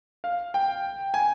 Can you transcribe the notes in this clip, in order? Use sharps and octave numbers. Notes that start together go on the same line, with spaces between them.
F5
G5
G#5